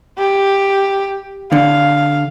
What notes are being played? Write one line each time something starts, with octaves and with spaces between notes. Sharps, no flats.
G4
D3 F5